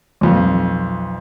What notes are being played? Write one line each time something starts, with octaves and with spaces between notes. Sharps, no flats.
B1 F2